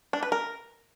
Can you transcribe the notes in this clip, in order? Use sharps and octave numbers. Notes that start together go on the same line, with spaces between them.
D4
B4
A#4